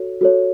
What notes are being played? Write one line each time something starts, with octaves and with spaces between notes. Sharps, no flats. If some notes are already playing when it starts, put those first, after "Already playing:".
Already playing: F#4 A4 C#5
F#4 A4 C#5